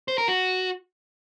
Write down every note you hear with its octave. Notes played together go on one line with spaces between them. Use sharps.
C5
A#4
F#4